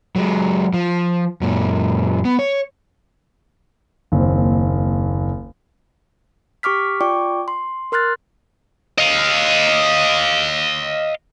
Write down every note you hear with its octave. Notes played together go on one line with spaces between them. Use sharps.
F#3 G#3
F3
F#2 A#2
B3
C#5
F#1 D#2 C4
G4 C#6 D6 F6 B6
F4 D5 G5 C#6 D6
C6
A#4 C6 F6 F#6 A6
D#5 F5